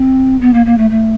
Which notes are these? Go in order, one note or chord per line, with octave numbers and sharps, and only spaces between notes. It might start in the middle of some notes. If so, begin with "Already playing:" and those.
Already playing: C4
B3
A#3
A#3
A3
A3